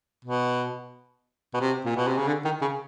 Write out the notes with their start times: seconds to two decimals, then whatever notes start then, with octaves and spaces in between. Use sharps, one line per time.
0.25 B2
1.54 B2
1.60 C3
1.85 A#2
1.96 B2
2.07 C3
2.18 C#3
2.27 D3
2.45 D#3
2.61 C#3